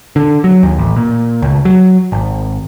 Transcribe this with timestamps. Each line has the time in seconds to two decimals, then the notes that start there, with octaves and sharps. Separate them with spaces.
0.16 D3
0.44 F#3
0.63 D#2
0.79 A1
0.97 A#2
1.42 C#2
1.65 F#3
2.12 G#1